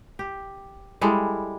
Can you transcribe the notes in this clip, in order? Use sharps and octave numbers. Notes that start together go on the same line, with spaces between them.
G4
G3 G#3 E4 A4